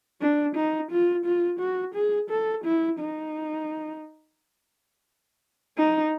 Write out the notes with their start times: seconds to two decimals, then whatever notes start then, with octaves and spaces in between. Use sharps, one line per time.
0.21 D4
0.56 D#4
0.91 F4
1.25 F4
1.60 F#4
1.95 G#4
2.30 A4
2.65 E4
2.99 D#4
5.78 D#4